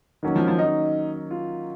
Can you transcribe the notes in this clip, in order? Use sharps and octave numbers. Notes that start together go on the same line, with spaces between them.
D#3 F#3 A#3 C#4
F3
F3
D#4
F4